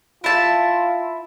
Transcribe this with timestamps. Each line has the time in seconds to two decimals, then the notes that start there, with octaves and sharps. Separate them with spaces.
0.24 E4 F4 A5